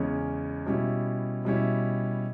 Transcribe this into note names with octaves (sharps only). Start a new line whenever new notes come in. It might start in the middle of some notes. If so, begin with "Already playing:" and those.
Already playing: E2 C#3 G#3 C#4 G#4
B2 G3 C#4 E4
B2 G3 C#4 E4